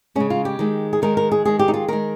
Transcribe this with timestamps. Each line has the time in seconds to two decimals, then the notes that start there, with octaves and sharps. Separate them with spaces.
0.15 C#3 G#3 C#4
0.30 F4
0.45 G4
0.59 D#3 G#3
0.93 G#4
1.02 D#3 G#3 A#4
1.17 A#4
1.32 G#4
1.45 D#3 G#3 G#4
1.59 G4
1.68 D#4
1.74 F4
1.88 D#3 G#3 A#4